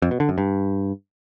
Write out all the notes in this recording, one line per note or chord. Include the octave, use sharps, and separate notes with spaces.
F2
B2
D3
F#2
G2